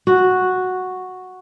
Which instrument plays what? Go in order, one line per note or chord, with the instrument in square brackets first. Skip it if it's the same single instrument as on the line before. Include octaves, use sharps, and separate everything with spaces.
[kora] F#4